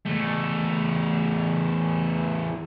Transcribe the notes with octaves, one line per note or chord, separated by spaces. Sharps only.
E2 A3